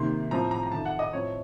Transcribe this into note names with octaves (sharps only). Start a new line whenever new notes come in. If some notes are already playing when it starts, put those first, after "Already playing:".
Already playing: C3 D#3 A#3 C6
A2 F3 C4 A#5
A#5
A#5
F2 D#3 A3 A5
F#5
D#5
A2 F3 C4 C#5